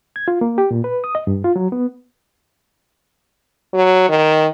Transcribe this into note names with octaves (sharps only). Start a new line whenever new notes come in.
G#6
F4
A#3
G4
A#2
B4
D#6
D#5
G2
F4
F#3
B3
F#3
D#3